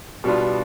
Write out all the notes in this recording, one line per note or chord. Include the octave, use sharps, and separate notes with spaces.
B2 G3 B3 D4 F4